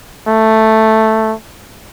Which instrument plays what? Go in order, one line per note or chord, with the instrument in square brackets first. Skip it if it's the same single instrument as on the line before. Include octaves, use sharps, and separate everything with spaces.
[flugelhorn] A3